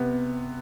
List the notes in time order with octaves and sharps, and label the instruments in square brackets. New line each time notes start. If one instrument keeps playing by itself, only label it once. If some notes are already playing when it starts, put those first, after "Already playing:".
Already playing: [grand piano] C3 B3